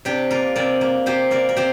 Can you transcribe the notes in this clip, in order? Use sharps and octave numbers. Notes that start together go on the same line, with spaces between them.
C3 D4 G4
A#3 F4 A#4
C3 A#4 D5
A#3
C3 G4 C5
A#3 A#4 D5
A#4
C3 G4 C5